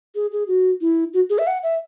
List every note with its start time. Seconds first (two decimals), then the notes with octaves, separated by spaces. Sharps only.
0.15 G#4
0.32 G#4
0.48 F#4
0.81 E4
1.14 F#4
1.30 G#4
1.39 E5
1.47 F#5
1.63 E5